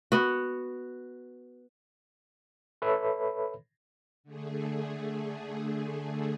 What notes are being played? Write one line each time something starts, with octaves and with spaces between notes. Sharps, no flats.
B3 F#4
A4 B4 C#5 E5 B5
D3 A3 G#4